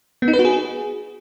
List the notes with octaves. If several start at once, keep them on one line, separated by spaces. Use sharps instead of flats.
B3
D#4
B4
F#4
G#4